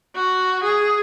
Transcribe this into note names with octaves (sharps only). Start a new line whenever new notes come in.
F#4
G#4